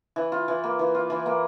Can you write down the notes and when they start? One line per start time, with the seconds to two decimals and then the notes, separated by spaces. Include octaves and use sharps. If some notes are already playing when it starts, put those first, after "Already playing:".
0.16 E3
0.32 F4
0.48 E3
0.64 A#3
0.79 E3
0.95 F4
1.10 E3
1.26 A#3